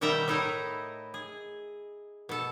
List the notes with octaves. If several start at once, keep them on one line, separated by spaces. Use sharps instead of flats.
B2 D#3 G3 E5 G5 A#5
A2 D#4 E4 A4 D#5
G#4
B2 A4